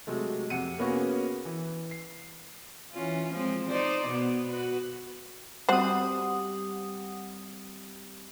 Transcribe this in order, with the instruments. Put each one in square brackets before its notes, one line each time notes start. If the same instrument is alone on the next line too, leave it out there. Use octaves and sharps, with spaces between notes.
[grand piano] C3 F#3 G#3 A3
F2 C3 F#5 C#7 D#7
A#3 B3 C#4 F#4 G#4
E3
C7
[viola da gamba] E3 C#4 F4
F3 G#3 C4
D#4 C5 D5
B2 B3
F#4 B4
[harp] G3 C4 [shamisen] F#4 C5 [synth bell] F#5 D#6